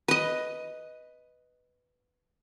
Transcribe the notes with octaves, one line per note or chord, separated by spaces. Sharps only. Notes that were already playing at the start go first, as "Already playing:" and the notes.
B4 D#5